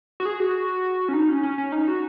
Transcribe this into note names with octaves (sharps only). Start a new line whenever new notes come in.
F#4
G#4
F#4
C#4
D#4
C#4
C#4
C#4
D#4
F#4